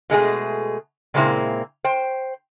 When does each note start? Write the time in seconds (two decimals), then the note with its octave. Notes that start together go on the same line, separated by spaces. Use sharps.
0.10 B2 G#3 A3 G#4
1.14 A#2 C#3 G#3 A#3 C4 E4
1.84 C5 G5